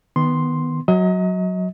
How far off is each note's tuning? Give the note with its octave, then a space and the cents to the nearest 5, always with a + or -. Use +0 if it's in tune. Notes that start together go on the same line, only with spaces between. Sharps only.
D#3 +0 B3 +0 C6 +0
F#3 -5 D#5 +35